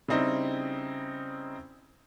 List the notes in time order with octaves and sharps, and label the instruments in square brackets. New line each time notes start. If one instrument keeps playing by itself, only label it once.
[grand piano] C#3 G3 C4 D#4 E4